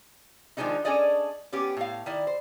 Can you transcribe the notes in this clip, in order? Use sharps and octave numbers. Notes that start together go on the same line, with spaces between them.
D#3 F3 F#3 G#3 D4 D#4
C#4 D4 G#4 A4 D5 D#5
B3 C#4 G4
A2 F5
D#3 E4 D5
C5